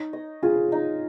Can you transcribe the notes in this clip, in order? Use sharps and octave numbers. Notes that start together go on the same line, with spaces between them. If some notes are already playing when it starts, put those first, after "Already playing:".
Already playing: D#4 C#5
D#5
F4 G#4
D#4